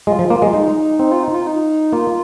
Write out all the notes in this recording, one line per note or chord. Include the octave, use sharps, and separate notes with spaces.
G#3 F4
F3
A#3
G#3
G#3 D#4
C4 D#4
F4
D#4
F4
D#4
A#3 F4